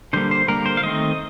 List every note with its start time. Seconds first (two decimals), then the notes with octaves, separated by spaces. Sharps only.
0.13 D3 G3 A#3 C5
0.31 C5
0.48 D3 G3 A#3 A#4
0.66 C5
0.77 F5
0.83 D#3 A3 C4 D#5